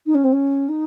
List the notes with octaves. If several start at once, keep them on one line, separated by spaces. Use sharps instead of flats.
D#4
C#4
C4
C#4
D#4